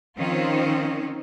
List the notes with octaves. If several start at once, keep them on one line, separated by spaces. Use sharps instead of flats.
D#3 F3 C4 C#4 F4 C5